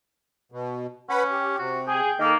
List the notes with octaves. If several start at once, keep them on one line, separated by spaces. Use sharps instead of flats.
B2
C#4 B4 F#5 B5
G4
C3 F#4
G#4 G5
D#3 A#3 A4